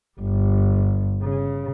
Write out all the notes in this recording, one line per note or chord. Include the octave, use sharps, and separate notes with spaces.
G1
C#3